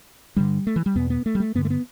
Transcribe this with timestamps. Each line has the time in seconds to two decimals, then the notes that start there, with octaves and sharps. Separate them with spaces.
0.36 G2 D3 G3
0.67 A3
0.76 E3
0.86 G3
0.95 E2 B2 B3
1.10 B3
1.26 A3
1.35 G3
1.40 A3
1.55 G2 D3 B3
1.65 A3
1.70 B3